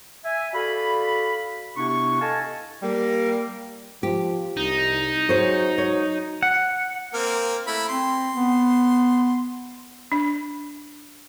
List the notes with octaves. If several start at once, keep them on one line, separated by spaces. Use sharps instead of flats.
E5 G#5
F#4 A4 D5 F5 B5
C3 B3 D4 E4 C#6
A4 D#5 F5 G#5 A5
G3 A#3
F3 G4
C2 D#4
F#3 G#4 C5 C#5
C#5
F#5
A#3 C4 A#4
A3 E4 B5
C4 C6
B3
D4